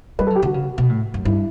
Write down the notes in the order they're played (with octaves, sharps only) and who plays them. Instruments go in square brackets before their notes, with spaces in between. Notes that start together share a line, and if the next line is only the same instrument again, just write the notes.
[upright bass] G3 [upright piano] B4
[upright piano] A4
[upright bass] F#3
[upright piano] G4
[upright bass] D3 [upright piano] F#4
[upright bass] C#3
B2
A2
F#2
[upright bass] G2 [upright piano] E4